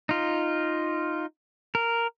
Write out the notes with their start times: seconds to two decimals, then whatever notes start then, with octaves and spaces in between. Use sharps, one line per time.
0.09 D#4 F4
1.75 A#4